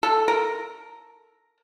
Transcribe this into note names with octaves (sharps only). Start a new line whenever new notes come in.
A4
A#4